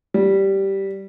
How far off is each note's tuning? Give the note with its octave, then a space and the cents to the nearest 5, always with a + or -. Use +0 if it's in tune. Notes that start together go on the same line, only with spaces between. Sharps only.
G3 -10